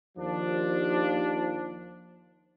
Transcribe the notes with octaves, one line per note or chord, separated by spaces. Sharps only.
D#2 F3 D4